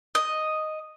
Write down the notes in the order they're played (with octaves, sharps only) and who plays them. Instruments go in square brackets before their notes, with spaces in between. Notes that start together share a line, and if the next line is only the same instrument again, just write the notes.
[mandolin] D#5